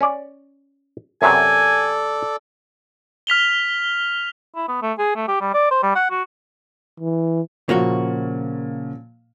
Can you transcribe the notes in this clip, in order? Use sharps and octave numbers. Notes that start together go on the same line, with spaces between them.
C#4 C#5 D5
F#2 C3 F#3 A4 D5 G#5
F6 B6 F7 G7
E4
B3
A3
G#4
A3
G4
G3
D5
C5
G3
F#5
F#4
E3
A#2 C#3 F3 A#3 F#4